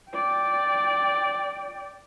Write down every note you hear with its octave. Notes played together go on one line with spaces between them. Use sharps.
D5 G5